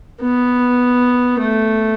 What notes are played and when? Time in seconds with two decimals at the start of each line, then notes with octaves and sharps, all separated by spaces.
0.21 B3
1.39 A3